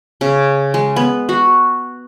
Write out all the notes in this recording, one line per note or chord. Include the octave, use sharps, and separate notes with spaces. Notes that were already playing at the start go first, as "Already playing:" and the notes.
C#3
G#3
B3
F#4